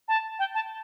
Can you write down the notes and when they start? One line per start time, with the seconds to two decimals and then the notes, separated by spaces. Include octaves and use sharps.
0.08 A5
0.39 G5
0.55 A5